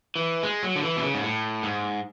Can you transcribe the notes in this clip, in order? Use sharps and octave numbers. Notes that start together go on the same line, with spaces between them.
E3
G#3
F#3
D3
E3
B2
C#3
G#2
A2
G#2